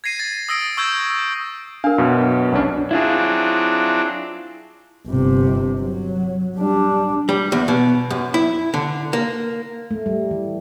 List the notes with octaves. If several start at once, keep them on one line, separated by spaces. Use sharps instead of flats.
G#6 A#6 C7 D#7
A6
D#6 E6 A#6 D7
C#6 E6 G6 G#6
D4 A#4 F5
F#2 B2
C2 C#4 D4
F#3 C4 D4 E4 F4 G#4
G1 C3
F#3
G3 D4
G3
E2
B2
F#2
E4
D3
A#3
A3
G3
E3